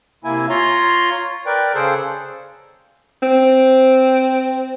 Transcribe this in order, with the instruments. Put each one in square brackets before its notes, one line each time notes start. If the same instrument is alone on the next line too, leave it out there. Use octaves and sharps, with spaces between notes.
[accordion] C3 A#3 E4 G#5
F4 C#5 A#5 C6
A#4 B4 D5 G5
C#3 G#4 A4 C5
[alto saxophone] C4